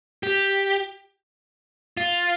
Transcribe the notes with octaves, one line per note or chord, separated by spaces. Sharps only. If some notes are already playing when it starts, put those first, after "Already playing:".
G4
F4